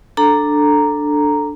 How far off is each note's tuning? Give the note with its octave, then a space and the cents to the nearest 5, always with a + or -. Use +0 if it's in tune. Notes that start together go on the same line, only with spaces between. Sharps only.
D4 +5 A4 +0 A#5 +0